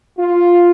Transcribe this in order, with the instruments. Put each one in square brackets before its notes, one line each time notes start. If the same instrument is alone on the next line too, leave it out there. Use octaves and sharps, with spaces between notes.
[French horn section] F4